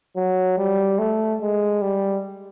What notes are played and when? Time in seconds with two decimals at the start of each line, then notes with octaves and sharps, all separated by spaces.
0.16 F#3
0.58 G3
0.99 A3
1.41 G#3
1.82 G3